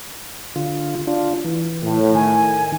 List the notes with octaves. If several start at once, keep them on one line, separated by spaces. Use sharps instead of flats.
D3 F4
D4 F4
E3
A2
D#3 G#5